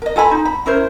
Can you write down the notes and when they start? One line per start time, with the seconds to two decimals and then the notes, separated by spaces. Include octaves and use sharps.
0.02 A#4 D#5
0.16 F4 A4 G#5 B5
0.31 D#4
0.45 B5
0.66 C#4 E4 A#4 C5